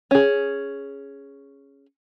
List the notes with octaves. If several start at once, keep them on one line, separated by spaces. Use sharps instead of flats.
C#4 G#4